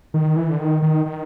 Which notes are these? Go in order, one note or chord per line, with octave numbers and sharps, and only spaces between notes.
D#3
E3
D3
D#3
D#3
D#3